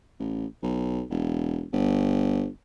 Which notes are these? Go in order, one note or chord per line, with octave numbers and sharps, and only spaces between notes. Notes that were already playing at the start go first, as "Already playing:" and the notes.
A1
B1
E1
G1